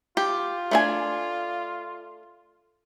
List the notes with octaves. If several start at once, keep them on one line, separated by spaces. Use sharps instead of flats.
F4 G4
A3 D4 G#5